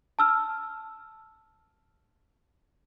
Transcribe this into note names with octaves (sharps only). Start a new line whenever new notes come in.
A5 E6 F6